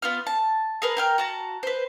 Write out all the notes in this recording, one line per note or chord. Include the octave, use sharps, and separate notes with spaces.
B3 F4 F6
A5
G#4 A#4 B4
A#4 G5 F6
F#4 A5 A#5
B4 C5